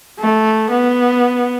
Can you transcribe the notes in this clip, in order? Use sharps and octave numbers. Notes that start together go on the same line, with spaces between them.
A3
B3